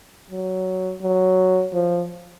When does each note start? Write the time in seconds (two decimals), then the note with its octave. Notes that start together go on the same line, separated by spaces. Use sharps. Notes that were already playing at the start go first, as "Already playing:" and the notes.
0.30 F#3
1.01 F#3
1.74 F3